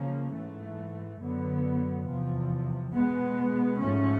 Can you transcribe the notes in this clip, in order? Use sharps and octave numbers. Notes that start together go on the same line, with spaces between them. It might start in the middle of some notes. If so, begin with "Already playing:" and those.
Already playing: C#3 F3 A#3 C#4
G#2 E3 A3
F#2 D3 F#3 B3
E2 C3 F3
B2 G#3 B3
G#2 F3 A3 C#4